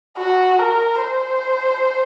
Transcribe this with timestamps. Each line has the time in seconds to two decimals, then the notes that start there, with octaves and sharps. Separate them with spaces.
0.18 F#4
0.59 A#4
1.01 C5